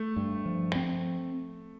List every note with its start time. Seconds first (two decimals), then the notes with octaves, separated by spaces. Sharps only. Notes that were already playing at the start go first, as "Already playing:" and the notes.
Already playing: A3
0.16 G2
0.46 F3
0.75 C4